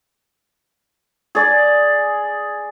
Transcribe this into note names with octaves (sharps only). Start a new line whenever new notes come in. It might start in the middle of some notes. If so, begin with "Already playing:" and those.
G#4 D5